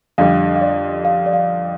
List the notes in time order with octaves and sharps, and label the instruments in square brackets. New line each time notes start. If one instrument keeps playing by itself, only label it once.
[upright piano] F2 D3 G3 [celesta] F5
[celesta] F5
D5
F5
D5
F5